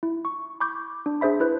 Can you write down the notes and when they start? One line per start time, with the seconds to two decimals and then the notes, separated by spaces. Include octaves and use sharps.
0.03 E4
0.25 C#6
0.60 B5 C#6 D6 G6
1.06 D4
1.21 D4 G#4 C5 E5 B5
1.40 E4 B4 C5